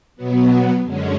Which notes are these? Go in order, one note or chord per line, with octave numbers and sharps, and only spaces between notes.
B2 F#3 B3
F#2 D3 G#3 C#4